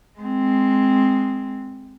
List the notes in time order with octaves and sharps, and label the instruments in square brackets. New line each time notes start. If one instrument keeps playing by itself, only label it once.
[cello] G#3 C4